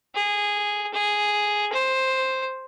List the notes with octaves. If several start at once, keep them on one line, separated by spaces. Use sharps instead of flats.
G#4
G#4
C5